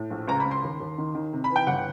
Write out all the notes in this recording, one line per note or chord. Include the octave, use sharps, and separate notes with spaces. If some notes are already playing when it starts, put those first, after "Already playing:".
Already playing: A2
A#1
C#2 A#5
B5
C#2
C6
D#2
D#2
D#3
D#3
C3
B5
E3
G5
G1 F#5